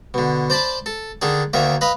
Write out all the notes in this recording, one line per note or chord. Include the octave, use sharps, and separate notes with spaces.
B2 D3
C5 D5 A5 B5
A4
D3 D#3 D4 G#4
D2 D3 D#3 A#3 E5
B4 D#5 F5 B5